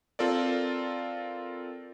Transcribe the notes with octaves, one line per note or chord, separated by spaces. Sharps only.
C4 F4 A4 A#4 D5